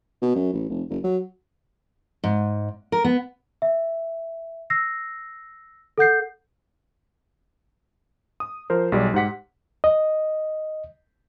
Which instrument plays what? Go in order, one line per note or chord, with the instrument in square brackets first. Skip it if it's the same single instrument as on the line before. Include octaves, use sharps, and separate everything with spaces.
[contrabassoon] B2
F#2
A1
F1
F#1
F#3
[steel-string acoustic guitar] G#2
A#4
B3
[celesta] E5
E6 A#6 C7
A4 F#5 G6 C7
[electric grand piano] D#6
F3 A#4 C5
B1 G3 G#4 D5
G#2 G4 F#5 B6
[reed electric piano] D#5